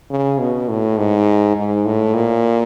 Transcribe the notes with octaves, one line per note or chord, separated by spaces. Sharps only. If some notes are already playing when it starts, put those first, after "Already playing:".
C#3
B2
A2
G#2
G#2
A2
A#2